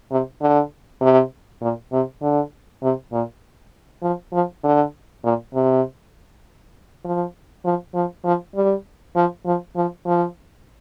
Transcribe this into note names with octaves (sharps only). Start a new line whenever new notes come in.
C3
D3
C3
A#2
C3
D3
C3
A#2
F3
F3
D3
A#2
C3
F3
F3
F3
F3
G3
F3
F3
F3
F3